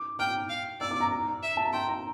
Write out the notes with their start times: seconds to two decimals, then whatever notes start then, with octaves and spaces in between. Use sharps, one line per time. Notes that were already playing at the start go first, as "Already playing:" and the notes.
Already playing: D6
0.19 G5 F6
0.49 F5
0.80 D5 E6
0.91 D6
1.01 A#5
1.11 A#5
1.43 E5
1.57 A5
1.65 A#5
1.73 G5 C6
1.88 A#5